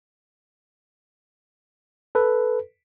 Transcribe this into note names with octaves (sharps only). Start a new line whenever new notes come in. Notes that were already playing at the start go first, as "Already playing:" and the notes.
A4 B4